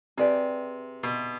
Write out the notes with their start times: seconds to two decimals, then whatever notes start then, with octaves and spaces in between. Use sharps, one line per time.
0.17 C3 G#4 B4 D5 G5
1.03 B2